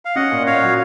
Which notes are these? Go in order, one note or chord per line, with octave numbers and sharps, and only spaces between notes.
F5
C#4 D#5 F#5
A#2
A#2 C#5 F5
F#3